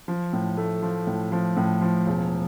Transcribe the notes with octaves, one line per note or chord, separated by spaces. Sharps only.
F3
A2
A3
F3
A2
F3
A2
F3
E1